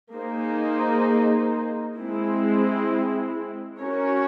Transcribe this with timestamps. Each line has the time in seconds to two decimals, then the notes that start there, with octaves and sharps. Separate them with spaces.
0.14 A#3 D#4 G#4 C5
1.97 G#3 C4 E4
3.81 C#4 F#4 A#4 C#5